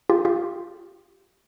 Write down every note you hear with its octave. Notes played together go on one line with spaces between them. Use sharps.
F4 G4
F4 G4